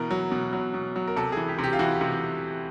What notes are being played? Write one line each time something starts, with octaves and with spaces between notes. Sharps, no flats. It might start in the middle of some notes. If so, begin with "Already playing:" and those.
Already playing: B2 E3 A#4
F#3
B2
F#3
B2
F#3
A#4
C3 A4
E3 G#4
G4
C3
G4
F4
E3 F#4
C3